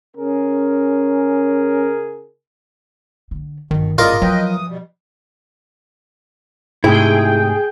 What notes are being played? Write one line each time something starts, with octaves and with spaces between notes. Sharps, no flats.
C#3 C#4 G#4 A#4
D3
G1 B2 D#3
A2 C#3 F4 A#4 D5 D#5
F3 F#3 B4 D#5 G5
E3 D#6
B2 G3
G#2 C3 A3 E4 G#4 G5